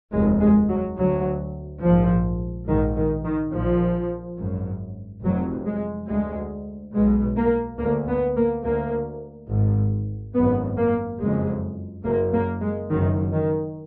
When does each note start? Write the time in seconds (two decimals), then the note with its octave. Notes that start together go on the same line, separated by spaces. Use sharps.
0.12 F1 D#2 G#3
0.40 G#3
0.69 F#3
0.97 D2 F#3
1.82 A#1 G#2 F3
2.67 A#1 G#2 D#3
2.96 D#3
3.24 D#3
3.53 A#1 A#2 F3
4.38 G#1 F#2
5.23 F1 F2 F#3
5.66 G#3
6.09 D2 G#3
6.93 B1 B2 G#3
7.37 A#3
7.79 D2 A#3
8.08 B3
8.36 A#3
8.64 D2 A#3
9.50 G#1 G#2
10.35 G#1 F#2 B3
10.77 A#3
11.20 F#1 G#3
11.25 F2
12.05 F#1 F#2 A#3
12.33 A#3
12.62 G#3
12.90 F#1 F#2 D#3
13.33 D#3